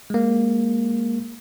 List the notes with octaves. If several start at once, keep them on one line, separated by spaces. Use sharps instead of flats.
G#3 A#3